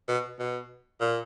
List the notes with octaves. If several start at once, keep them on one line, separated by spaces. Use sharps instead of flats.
B2
B2
A#2